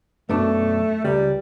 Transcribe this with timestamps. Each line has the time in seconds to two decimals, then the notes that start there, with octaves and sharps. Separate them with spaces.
0.29 F#2 B2 A3 D4
1.04 C#2 G3